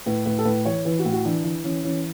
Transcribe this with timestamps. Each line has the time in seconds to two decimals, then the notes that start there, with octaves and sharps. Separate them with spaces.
0.06 A2 B4
0.25 A2 B4
0.38 A4
0.45 A2 B4
0.65 E3 C#5
0.85 E3 B4
0.99 F#4
1.05 A2
1.12 F#4
1.25 E3 D4
1.44 E3
1.64 E3 C#4
1.84 E3 C#4